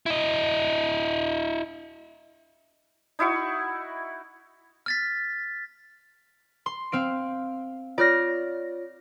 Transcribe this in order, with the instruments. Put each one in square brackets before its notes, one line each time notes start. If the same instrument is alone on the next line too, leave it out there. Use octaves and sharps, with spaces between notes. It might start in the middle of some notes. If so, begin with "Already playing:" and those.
[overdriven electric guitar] E4 D#5
[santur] D#4 E4 F#4 C#6
[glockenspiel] F6 A6 B6
[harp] C6
C4 F5 D7
[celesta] F4 C#5 [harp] D5 F6 A#6